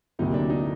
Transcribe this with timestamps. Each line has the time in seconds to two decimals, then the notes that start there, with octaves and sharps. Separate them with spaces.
0.19 D2 C3 F#3 A#3 D#4
0.34 D4
0.50 D#4